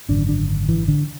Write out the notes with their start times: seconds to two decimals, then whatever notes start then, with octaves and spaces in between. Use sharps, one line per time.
0.09 G#1 F#2 D3 D4
0.29 D4
0.69 E3
0.88 D3